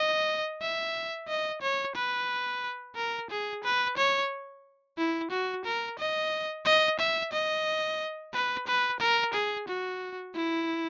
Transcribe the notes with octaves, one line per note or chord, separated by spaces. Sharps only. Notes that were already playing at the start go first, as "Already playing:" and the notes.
Already playing: D#5
E5
D#5
C#5
B4
A#4
G#4
B4
C#5
E4
F#4
A#4
D#5
D#5
E5
D#5
B4
B4
A#4
G#4
F#4
E4